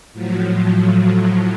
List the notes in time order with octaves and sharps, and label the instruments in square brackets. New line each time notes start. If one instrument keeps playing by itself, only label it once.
[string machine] A2 F3 F#3